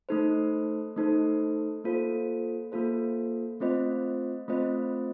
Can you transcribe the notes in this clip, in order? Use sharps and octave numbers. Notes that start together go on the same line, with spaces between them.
A3 D#4 A4 C5
A3 D#4 A4 C5
A#3 F4 A4 C5
A#3 F4 A4 C5
A3 C4 F4 C5 D#5
A3 C4 F4 C5 D#5